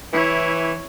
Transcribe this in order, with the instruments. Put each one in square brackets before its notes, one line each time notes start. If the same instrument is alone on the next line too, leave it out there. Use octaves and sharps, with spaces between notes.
[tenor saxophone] E3 [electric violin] E4 C#5